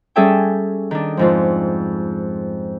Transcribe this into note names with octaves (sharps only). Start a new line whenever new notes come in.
G3 C#4 G#4 A4 E5 G5
D#3 D4
F2 G#2 F3